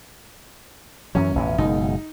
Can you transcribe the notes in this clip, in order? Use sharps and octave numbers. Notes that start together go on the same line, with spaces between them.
F#2 E3 F#3 C#4
A1 F2 B2
F#1 B2 G#3 D#4